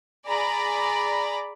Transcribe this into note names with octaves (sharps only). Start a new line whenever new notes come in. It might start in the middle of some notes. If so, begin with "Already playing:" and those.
G#4 D5 A#5 B5